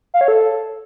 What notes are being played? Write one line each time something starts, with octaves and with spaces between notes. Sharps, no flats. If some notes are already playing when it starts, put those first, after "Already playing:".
F5
C#5
A4